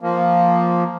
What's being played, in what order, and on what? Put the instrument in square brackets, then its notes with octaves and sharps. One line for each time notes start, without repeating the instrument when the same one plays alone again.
[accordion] F3 A#3